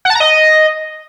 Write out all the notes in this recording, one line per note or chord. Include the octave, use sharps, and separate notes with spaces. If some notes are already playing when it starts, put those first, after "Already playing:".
F#5
A5
A#5
D#5